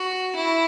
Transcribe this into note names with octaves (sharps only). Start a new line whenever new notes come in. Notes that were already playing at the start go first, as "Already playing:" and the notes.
Already playing: F#4
E4